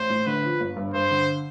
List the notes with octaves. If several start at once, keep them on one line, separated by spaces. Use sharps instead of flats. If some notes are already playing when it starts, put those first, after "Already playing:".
Already playing: A1 C5
A2
D3 B4
F3
G1
G2
G2 C5
D3